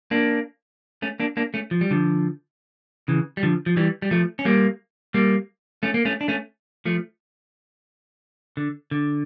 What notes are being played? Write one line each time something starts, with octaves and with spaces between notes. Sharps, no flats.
A#3 D4
A3 C#4
A#3 D4
A#3 D4
A3 C#4
F3
G3
D3 F3
C#3 E3
G3
D3 F3
F3
E3 G3
G3
F3 A3
C#4
G3 A#3
G3 A#3
A3 C#4
A#3
A3 C#4
D4
A3 C#4
F3 A3
D3
D3